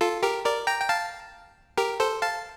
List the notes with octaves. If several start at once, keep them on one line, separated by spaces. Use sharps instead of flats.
F4 A4
G4 A#4
A#4 D5
G5 A#5
G5
F5 A5
G4 A#4
A4 C5
F5 A5